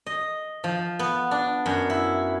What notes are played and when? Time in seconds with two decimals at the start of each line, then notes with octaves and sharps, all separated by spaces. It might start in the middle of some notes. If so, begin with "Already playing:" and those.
0.07 D#5
0.64 F3
0.99 B3
1.31 D4
1.66 F#2
1.90 E4